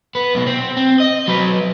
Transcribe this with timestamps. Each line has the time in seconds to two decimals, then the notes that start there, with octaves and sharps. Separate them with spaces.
0.15 B3
0.35 B1 B2
0.47 C4
0.77 C4
1.00 D#5
1.28 F#3 B4